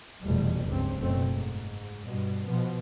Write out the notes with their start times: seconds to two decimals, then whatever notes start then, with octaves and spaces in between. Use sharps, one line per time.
0.23 F1 E2 B2 G3
0.67 C#2 G2 C4
1.00 F#1 F#2 B2 A3 C4
1.28 G#2
2.04 G2 B2
2.46 B2 F3 B3